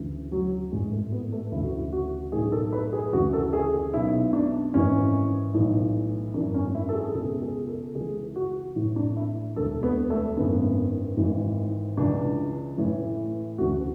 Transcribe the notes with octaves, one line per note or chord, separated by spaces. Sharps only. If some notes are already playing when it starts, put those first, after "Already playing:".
Already playing: D2 C#3 E3
F#3
A1 G#2 E3 G#3
A3
B3
A3
D2 C#3 E3 E4
F#4
E4
F#4
B1 A2 E3 G#4
A4
B4
G#4
D2 C#3 E3 F#4
A4
G#4
G#4
B1 B2 E4
D4
G#1 G#2 E3 C#4
B1 A2 E3
G#1 F#2 E3 D4
C#4
E4
A4
G#4
C#2 B2 G#4
G#4
A4
C#2 C#3 E3 G#4
F#4
A1 A2 E3
D4
E4
E1 D2 D3 A4
B3
A3
G#1 F#2 D3 B3
G#1 G#2 E3
C#2 C#3 E3 D4
A1 A2 E3
D2 C#3 E3 F#4